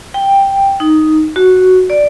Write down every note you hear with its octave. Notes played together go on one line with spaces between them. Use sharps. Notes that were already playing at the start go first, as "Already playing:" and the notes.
G5
D#4
F#4
D5